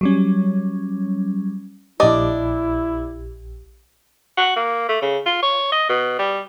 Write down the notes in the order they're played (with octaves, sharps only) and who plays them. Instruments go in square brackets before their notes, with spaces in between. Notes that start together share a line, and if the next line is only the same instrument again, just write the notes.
[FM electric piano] F#3 G3 C#4
[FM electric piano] A#1 G4 [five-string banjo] D4 D5 D#5 [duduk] E4
[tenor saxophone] F#4
A#3
A3
C#3
F4
C#5
D#5
B2
G3